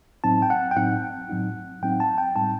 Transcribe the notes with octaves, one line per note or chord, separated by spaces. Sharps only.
A2 F#3 C4 D#4 A5
G5
F#5
G5
A2 F#3 C4 D#4 F#5
A2 F#3 C4 D#4
A2 F#3 C4 D#4 G5
A5
G5
A2 G3 C4 D#4 A5